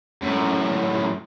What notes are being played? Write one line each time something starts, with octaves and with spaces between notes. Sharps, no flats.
F#2 A2